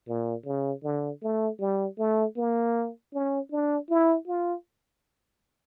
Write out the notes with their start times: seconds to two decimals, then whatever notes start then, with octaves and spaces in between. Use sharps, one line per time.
0.08 A#2
0.46 C#3
0.84 D3
1.22 A3
1.60 G3
1.98 A3
2.36 A#3
3.13 C#4
3.51 D4
3.89 E4
4.27 F4